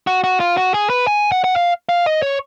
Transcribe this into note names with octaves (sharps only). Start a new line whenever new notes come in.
F#4
F#4
F4
F#4
G#4
B4
G#5
F#5
F#5
F5
F5
D#5
C#5